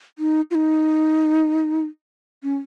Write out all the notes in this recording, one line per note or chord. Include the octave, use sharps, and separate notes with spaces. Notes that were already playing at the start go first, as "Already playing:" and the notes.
D#4
F4
D#4
C#4